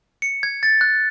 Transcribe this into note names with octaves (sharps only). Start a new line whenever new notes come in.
C#7
G#6
A6
F#6